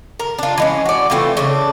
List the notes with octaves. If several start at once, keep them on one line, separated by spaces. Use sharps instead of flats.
A#4
D4 F4
E3 G#3 C#4
F#4 D5
E3 A3 C4 F4
C#3 D4